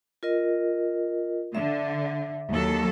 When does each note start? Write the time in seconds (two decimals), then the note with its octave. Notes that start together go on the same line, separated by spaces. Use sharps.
0.23 F4 A#4 D#5
1.55 D3 E5
2.50 D#2 F#3 A4